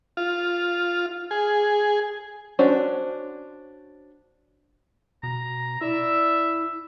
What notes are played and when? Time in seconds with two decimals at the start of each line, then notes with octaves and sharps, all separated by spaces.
0.17 F4
1.31 G#4
2.59 C#4 D4 F#4 C5
5.23 B2 A#5
5.81 E4 D5 E5 E6